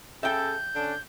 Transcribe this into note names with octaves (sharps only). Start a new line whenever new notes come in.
C#3 A4 E5 G5 G6
D3 C#4 D4